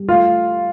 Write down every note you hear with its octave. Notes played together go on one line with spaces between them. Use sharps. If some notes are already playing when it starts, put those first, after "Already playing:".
Already playing: G3
A3 F4